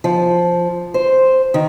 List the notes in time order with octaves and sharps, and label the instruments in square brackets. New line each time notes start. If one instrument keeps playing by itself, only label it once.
[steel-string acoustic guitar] F3
C5
D#3